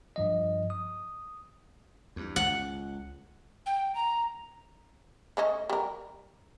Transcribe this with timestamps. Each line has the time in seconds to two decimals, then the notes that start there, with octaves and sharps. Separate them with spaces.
0.16 G2 F3 D#5
0.70 D#6
2.16 E2 G2
2.36 C#2 F#5
3.66 G5
3.95 A#5
5.37 A3 C#4 D#5
5.70 G3 A#4